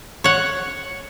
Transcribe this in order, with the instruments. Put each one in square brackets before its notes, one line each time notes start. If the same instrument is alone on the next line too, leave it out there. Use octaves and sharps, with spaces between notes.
[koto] C#5 F#5